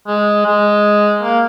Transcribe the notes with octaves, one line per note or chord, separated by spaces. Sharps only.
G#3
G#3
A#3